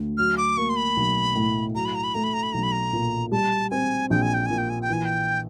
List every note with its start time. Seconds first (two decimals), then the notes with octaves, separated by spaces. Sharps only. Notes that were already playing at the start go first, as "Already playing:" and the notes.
Already playing: D2
0.18 F#3 F6
0.37 D6
0.57 A#3 C#6
0.69 C6
0.76 B5
0.97 B1
1.35 A2
1.75 F#3 A#5
1.85 B5
1.95 A#5
2.04 B5
2.14 A3 A#5
2.24 B5
2.34 A#5
2.43 B5
2.53 B1 A#5
2.63 B5
2.72 A#5
2.93 A#2
3.31 G3 A5
3.71 C4 G#5
4.10 A#1 G5
4.22 G#5
4.34 G5
4.46 A#2 G#5
4.58 G5
4.70 G#5
4.82 G5
4.89 E3 G#5
5.05 G5